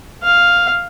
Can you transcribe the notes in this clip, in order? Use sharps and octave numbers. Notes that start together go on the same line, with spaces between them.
F5